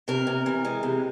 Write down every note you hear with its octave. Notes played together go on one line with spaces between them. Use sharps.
C3 A#4
C3
E3
G#3
C3